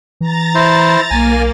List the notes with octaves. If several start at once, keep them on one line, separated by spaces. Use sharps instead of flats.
E3 A#5 A6
E4 C5
B1 A#3 G#5